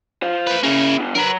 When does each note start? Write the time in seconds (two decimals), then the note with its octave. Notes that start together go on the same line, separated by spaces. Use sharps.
0.22 C5 F5
0.47 A3 B4
0.63 A#3 C#4 E4 G#4
0.99 B3 D4
1.15 F#3 A#4 B4 A#5